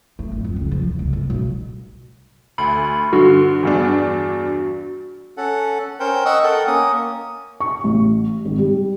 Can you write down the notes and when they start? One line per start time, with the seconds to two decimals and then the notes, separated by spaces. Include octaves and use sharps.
0.19 A3
0.32 G#1
0.44 F2
0.56 C#2
0.71 F3
0.87 C3
0.99 C#2
1.13 G1
1.30 B1
2.58 D2 B5
3.13 G2 D3 F#4
3.63 E2 G2 D4
5.37 C#4 A4 F#5
6.00 C#4 A#4 C5 G5
6.26 D#5 F#5 C#6 D#6 E6
6.44 A4 A#4 F#5 G5
6.67 A#3 C#4 D#6
7.60 C#6
7.84 A1
8.45 G#1
8.58 G3